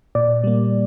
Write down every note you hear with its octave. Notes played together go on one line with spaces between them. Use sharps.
A#2 D5
G3 A#3